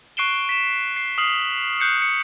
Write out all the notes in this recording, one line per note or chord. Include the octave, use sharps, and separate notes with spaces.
C#6 F#6 C7 D7 E7 G7
B6 E7
C7
D#6 F6 C7 F#7
F#6 G6 C7 C#7
C#7